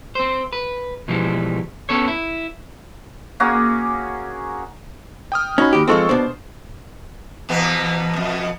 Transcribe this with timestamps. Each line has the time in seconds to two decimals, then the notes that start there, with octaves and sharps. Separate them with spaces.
0.15 C4 C5
0.53 B4
1.08 B2 D3 E3 F3 G3 G#3
1.89 B3 C#4 A4 C#5
2.08 E4
3.40 A#3 C#4 F#4 G#4
5.32 G5 D#6 F6
5.58 C#4 D#4 F#4 B5
5.73 D#2 G4
5.87 F3 G#3 C4 F4 A4 C#6
6.09 B2 D4 C5
7.49 E2 B2 B3
8.13 F2 B2